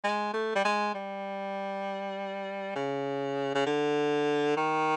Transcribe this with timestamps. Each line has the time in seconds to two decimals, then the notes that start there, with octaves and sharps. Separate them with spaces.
0.04 G#3
0.33 A3
0.55 G3
0.65 G#3
0.95 G3
2.75 C#3
3.55 C#3
3.66 D3
4.57 D#3